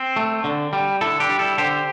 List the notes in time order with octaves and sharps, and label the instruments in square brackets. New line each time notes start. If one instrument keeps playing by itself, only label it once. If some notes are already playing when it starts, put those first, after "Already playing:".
Already playing: [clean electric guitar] C4
A3
D3
G3
D3 E4 A4
D4 G4
G3
E4 A4
D3 G4 C5